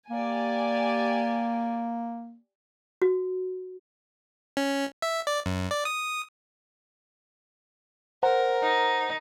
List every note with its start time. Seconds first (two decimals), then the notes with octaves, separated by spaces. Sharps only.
0.10 A#3 G4 D5 G#5
3.02 F#4
4.57 C#4
5.02 E5
5.27 D5
5.46 F#2
5.71 D5
5.85 D#6
8.23 A#4 C5 F#5 A#5
8.63 D#4